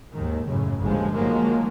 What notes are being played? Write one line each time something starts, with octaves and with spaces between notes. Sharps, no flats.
D#2 G#2 D#3
F#2 A2 C#3
G1 D#2 F3 G#3
D#3 F3 F#3 G#3 A#3